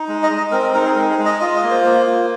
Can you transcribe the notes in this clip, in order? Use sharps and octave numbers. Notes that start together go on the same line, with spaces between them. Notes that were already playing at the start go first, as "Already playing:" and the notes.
Already playing: D#4
G#3
D#5
G#3
D#5
C4 A#4
A#4
D#4 A#4
G#4
G#3 A#4
G#4
G#3
D#5
F4 D#5
D#5
A#3
C5
A#3
F4